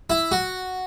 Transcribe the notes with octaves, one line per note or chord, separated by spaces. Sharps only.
E4
F#4